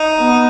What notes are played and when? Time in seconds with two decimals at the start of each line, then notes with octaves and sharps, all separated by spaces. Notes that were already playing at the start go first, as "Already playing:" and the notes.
Already playing: D#4
0.18 B3